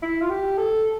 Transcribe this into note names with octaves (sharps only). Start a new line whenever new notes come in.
E4
F4
G4
A4